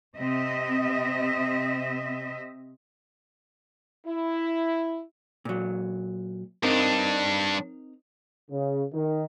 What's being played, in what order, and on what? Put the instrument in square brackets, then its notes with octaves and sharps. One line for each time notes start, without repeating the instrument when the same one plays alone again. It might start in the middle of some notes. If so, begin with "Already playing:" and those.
[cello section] C3 C4 D#5 E5
[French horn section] E4
[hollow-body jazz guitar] A#2 F#3
[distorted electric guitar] G2 D4 [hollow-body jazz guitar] C4 D#4 A#4
[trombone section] C#3
D#3